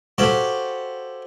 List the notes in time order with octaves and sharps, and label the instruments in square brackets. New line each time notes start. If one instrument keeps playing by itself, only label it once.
[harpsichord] F#4 G4 A4 C5 C#5 F5